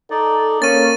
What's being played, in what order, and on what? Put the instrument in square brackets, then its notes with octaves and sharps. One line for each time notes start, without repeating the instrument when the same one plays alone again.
[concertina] D#4 D5 [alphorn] A4
[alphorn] A#3 [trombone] C#4 [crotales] A6 D#7